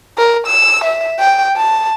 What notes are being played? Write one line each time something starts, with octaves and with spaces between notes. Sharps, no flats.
A#4
E6
E5
G5
A5